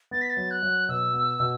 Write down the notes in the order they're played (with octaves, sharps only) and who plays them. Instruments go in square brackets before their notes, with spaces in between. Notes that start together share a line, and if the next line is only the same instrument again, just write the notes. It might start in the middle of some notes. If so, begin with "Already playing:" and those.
[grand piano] B3 [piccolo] A6
[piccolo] B6
A6
[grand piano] F#3
[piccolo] F#6
[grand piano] F#3
[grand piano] B2 [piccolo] E6
[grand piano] B3
B2